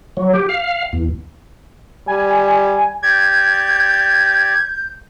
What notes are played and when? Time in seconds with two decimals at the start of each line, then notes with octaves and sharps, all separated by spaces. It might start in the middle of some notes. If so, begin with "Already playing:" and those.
0.17 F#3
0.33 G4
0.49 F5
0.93 E2
2.07 G3 G#5
3.03 G4 D5 G6 G#6